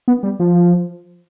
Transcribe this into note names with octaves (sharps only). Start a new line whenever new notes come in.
B3
G3
F3